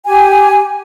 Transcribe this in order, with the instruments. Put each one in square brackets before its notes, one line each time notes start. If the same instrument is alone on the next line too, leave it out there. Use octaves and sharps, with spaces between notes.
[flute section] G4 G#5